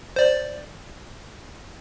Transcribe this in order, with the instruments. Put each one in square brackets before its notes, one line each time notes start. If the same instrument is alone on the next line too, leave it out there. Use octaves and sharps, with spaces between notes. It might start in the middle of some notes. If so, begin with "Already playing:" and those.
[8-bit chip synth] C5 D5